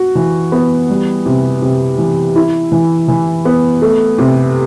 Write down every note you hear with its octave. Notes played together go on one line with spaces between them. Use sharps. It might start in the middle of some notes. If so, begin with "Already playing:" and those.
Already playing: F#4
E3
B3
G3
C3
C3
E3
E4
E3
E3
B3
A3
C3